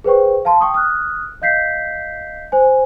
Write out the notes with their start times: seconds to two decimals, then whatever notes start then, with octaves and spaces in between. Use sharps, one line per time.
0.04 G#4 B4 C5 G5 C#6
0.45 F5 A5 C6
0.61 G5 C#6 D#6
0.74 D#6 F6 F#6
1.42 D#5 F5 G6 B6 C7
2.52 C5 G#5